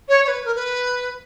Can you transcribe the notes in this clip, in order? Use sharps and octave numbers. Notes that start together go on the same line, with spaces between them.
C#5
C#5
B4
A#4
B4